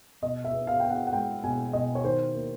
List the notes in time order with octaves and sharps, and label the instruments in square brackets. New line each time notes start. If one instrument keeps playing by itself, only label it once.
[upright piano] B2 D#5
E5
B3
F5
B3 G5
F#5
F#5
G#3 G5
B2 G#5
B2 D#5
C#5
D#3 C5
A#3